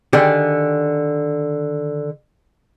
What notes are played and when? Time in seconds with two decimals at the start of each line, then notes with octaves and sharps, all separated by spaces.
0.13 D3 D#3 G4 G#4 D5